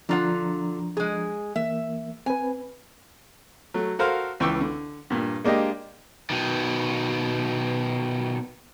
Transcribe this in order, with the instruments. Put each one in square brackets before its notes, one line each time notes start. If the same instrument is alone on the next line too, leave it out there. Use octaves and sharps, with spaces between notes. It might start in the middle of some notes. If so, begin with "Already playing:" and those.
[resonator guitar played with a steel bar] D3 F4 F#5 [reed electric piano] F3 D4 A#5
[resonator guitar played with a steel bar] G#3 G#4
[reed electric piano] E3 A#3 [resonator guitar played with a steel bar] E5
[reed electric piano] C4 B4 [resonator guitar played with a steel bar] G#5
[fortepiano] F#3 A3
F#4 A4 A#4 C5 F5
C#2 E3 G5 C#6 D6 E6
D3
G2 A#2
G#3 A#3 D4 G4 D#5
[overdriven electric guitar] B2 D#3